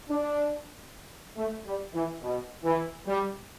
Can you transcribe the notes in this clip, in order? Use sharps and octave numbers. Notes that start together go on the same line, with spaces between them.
D4
A3
G3
E3
B2
E3
G3